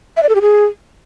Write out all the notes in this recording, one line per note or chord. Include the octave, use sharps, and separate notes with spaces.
E5
D5
A4
G4
G#4